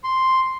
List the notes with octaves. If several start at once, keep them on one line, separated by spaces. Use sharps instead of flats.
C6